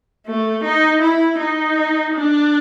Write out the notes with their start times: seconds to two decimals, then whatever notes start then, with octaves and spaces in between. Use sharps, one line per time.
0.27 A3
0.64 D#4
1.01 E4
1.39 D#4
2.15 D4